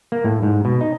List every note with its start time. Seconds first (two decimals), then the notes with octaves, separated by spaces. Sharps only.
0.12 A#3
0.24 A2
0.43 G#2
0.65 B2
0.81 D#4